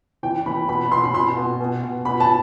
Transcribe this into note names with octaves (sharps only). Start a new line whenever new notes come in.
E3 G5
E3 B5
B2 B5
B2 C6
B5
B2 C6
B2
B2
B2
B2 B5
A5